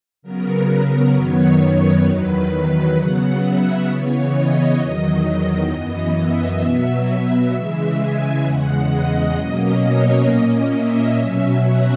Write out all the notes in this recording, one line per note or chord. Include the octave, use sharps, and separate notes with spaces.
C#3 F#3 B3 A#4
F#2 D#3 F#3 B3 C#5
C#5
E2 D#3 F#3 B4
C#3 F#3 B3 F#5
E5
C#3 E3 B3 C#5
D#5
E2 D#3 F#3
F#2 E3 B3 D#5
E5
B2 F#3 B3
C#3 E3 G#3
G#5
E2 C#3 G#3 F#5
D#5
B2 F#3 A#3 C#4 D#5
C#5
A#2 A#3 C#4 D#5
E5
B2 F#3 C#4
F#5